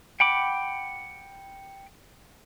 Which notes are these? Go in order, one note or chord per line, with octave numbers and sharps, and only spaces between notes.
F#5 G5 B5 D6